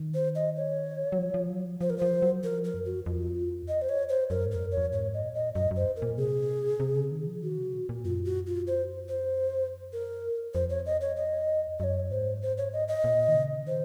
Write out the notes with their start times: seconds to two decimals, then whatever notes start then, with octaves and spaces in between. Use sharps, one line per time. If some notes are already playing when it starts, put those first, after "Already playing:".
Already playing: D#3
0.14 C5
0.35 D#5
0.56 C#5
1.12 F#3
1.18 F3
1.34 F3
1.50 F#3
1.65 F3
1.81 F3 C5
1.90 A#4
1.98 F3 C5
2.22 F#3
2.43 F3 A#4
2.64 A#4
2.74 F#2
2.85 F#4
3.06 F2 F4
3.68 D#5
3.82 C5
3.89 C#5
4.09 C5
4.30 F#2 A#4
4.46 G#2
4.51 F2 A#4
4.62 F#2
4.72 C#5
4.77 F2
4.93 G#2 C#5
5.14 D#5
5.24 A#2
5.35 D#5
5.55 F#2 D#5
5.71 F#2
5.76 C5
5.96 A#4
6.02 A#2
6.17 C3 G#4
6.80 C3
6.96 C#3
7.11 D#3
7.27 F3
7.43 D#3 F#4
7.58 C3
7.74 A#2
7.89 A#2
8.05 F#2 F4
8.25 F#4
8.47 F4
8.67 C5
9.09 C5
9.93 A#4
10.54 F2 C5
10.70 C#5
10.86 D#5
11.01 C#5
11.17 D#5
11.79 F#2 C#5 D#5
12.11 G#2 C5
12.42 C5
12.58 C#5
12.73 D#5
12.88 D#5
13.04 A#2
13.28 D#3
13.35 C#3
13.66 D#3 C5